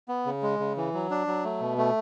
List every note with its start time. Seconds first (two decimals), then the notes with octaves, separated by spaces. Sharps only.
0.08 B3
0.26 C#3
0.43 G#3
0.59 C#3
0.77 E3
0.94 F#3
1.11 D4
1.27 F#3
1.44 A3
1.60 B2
1.78 A3